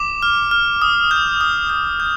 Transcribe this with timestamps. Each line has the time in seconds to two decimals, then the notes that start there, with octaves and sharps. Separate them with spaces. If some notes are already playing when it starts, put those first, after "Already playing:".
Already playing: D6 E7
0.22 F6
0.51 F6
0.82 D#6
1.11 G6
1.41 D#6
1.70 G6
2.00 G6